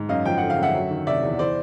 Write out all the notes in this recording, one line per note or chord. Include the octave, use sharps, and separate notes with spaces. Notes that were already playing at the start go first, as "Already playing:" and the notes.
Already playing: G#2
F#2 D#5 F5
F3 G5
D3 F#5
F5
F#2 E5 F#5
F#3
D#3
C3 D5 E5
E2
E3 C5 D5